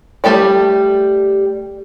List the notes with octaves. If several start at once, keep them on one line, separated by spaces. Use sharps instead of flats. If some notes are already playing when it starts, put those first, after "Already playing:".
G3 A3 G4 D5